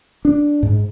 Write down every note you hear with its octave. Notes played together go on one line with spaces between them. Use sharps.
D4
G#2